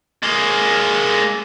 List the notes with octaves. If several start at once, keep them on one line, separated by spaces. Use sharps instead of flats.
G#3 A#3